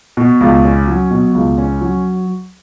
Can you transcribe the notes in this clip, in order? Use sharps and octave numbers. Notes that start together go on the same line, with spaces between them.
B2
C#2
C#4
F#3
B2
C#2
C#4
F#3